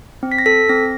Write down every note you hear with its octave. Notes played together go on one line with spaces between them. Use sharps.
C4
B6
A#6
A4 B6
C4 A#6